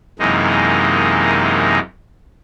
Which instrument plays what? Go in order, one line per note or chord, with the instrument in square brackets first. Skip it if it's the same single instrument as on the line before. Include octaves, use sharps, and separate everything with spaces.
[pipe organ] F#2 C3 E3 G#3 A#3 D#4